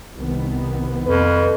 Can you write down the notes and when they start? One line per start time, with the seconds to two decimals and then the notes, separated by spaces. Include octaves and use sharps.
0.15 C2 D#3 B3
1.06 F2 B4